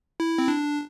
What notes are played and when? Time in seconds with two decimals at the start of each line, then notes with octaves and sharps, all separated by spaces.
0.20 E4
0.38 C4
0.48 D4